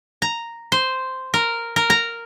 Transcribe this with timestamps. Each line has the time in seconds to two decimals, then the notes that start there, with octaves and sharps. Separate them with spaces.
0.22 A#5
0.72 C5
1.34 A#4
1.76 A#4
1.90 A#5